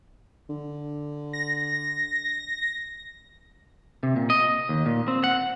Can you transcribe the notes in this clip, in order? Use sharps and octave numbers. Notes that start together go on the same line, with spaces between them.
D3
A#6
C3
A#2
D#5
D#2
A#2
C4
F#5